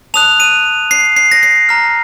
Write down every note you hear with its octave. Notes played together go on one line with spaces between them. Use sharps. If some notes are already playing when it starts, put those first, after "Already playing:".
A5 D#6 F#6 F7
D#7
C7
C7
A#6
C7
A#5 F6